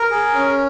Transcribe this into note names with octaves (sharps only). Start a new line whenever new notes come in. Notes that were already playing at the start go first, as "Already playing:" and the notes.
Already playing: A#4
G#4
C#4